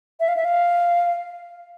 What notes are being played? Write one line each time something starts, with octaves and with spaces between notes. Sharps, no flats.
E5
F5
E5
F5